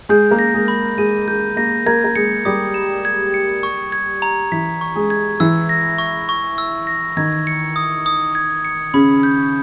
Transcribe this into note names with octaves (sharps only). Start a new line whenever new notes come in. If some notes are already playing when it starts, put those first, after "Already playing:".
G#3 G#4 G6
A#3 A#4
A#6
G#3 G#4
B5
G#3 G#4 D#7
G#3 G#4 G6
A#3 A#4 A#6
A#3 A#4 G#6
A#4
G#3 G#4 C#7
G3 G4 D#6
E7
G#6
C#7
C#6
G#6
A#5
E3 E4 B6
C#6
G#3 G#4
G#6
E3 E4 E6
A#6
C#6
C#6
E6
A#6
D#3 D#4 G#6
C#7
D#6
D#6
G#6
C#7
C#3 C#4 B5
G6